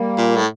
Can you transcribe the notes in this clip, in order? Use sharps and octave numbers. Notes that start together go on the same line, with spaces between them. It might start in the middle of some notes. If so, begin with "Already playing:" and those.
Already playing: G3 A#3
A#2
A2